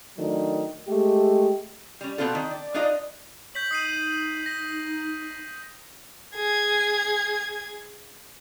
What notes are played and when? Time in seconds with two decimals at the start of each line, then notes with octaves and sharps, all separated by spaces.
0.17 D#3 F#3 A3 D4
0.88 G#3 A3 G4
2.01 G3 C#4
2.18 B2 G#3 C4 D4 F4 A4
2.35 D#3
2.51 D5
2.74 D4 D#4 F4 D5 D#5
3.55 C#5 G6 B6 F#7
3.71 D#4 D#6 C7 D#7
4.46 A#6
6.35 G#4 G#6